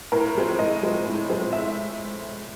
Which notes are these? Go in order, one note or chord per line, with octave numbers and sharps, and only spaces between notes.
A2 A#4
F3 G#3 C4
A2 D#5
F3 G#3 C4
A2
F3 G#3 C4
A2 E5